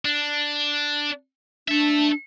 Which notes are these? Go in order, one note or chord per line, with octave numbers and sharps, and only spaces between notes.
D4
D4 A4 E5